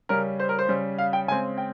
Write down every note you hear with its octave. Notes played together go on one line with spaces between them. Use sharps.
C#3 G3 C#4 A#4
C5
A#4
C5
C#3 G3 C#4
F5
G5
C#3 G#3 C4 G#5
G5